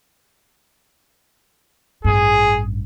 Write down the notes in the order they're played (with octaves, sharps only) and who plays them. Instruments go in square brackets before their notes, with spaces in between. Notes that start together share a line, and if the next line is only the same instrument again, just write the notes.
[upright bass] A1 G2 [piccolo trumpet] G#4